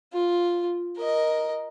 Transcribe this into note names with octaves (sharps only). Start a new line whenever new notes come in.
F4
A#4 D#5